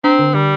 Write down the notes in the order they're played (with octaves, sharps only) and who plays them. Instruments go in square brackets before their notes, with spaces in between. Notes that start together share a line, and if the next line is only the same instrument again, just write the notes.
[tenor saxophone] C4 [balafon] D4
[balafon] D3
[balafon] D3 [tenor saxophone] G3